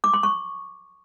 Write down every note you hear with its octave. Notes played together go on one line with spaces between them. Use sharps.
D6
C6
C#6